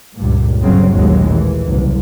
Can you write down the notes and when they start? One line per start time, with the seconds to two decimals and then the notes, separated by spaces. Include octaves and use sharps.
0.16 C#2 G2 A#2
0.62 G1 C#3 F#3 C4
0.93 A1 D#2 A#2 F#3 G#3
1.28 E3
1.65 F#1 C2